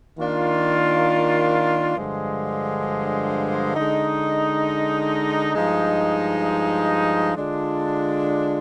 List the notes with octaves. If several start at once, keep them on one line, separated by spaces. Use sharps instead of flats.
D#3 A#3 D4 F4
G2 D3 F3 G#3
D3 G#3 D#4
G2 F3 G#3 D#4
D3 G#3 D4 F4